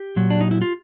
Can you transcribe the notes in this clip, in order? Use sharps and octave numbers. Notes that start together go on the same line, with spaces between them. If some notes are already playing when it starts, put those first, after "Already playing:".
Already playing: G4
A#2 F#3
D4
D#4
E4
F4